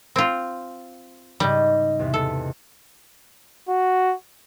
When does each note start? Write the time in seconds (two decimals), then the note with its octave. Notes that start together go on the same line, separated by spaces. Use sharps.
0.16 C4 F4
1.40 G#2 C#3 G3 D#5
1.99 E2 C3
2.14 A4
3.69 F#4